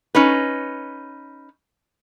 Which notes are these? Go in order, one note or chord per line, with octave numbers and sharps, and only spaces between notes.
C#4 D#4 B4